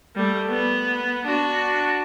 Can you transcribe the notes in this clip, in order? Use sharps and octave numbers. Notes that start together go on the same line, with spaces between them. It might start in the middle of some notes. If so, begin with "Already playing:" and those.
G3 A3
B3
D4 F#4